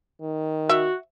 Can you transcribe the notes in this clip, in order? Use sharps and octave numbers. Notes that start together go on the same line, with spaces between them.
D#3
F#4 E5